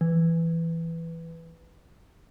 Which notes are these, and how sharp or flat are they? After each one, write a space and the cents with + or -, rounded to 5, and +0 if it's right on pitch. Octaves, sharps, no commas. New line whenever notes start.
E3 +5